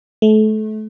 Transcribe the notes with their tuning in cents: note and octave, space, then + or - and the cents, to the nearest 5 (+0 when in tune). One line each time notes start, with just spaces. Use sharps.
A3 -30